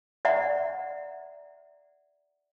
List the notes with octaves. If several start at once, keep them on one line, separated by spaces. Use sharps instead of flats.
D5 E5 F#5 A#5